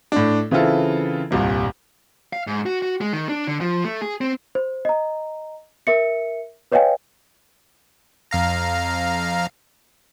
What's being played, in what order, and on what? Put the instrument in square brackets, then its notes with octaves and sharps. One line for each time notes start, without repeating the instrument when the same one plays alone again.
[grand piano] A2 D4
C#3 E3 C4 E4 F4 A4
D#1 C2 G2 A#2
[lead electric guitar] F5
G#2
F#4
F#4
G#3
D#3
D4
D3
F3
A3
G#4
C4
[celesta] C5
D#5 A#5
A#4 E5 C#7
B4 C#5 D#5 F5 G5 G#5
[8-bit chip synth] F2 F5 A#5